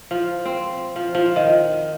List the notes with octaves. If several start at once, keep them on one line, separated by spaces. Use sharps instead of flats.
F3
C4
F3
F3
D#3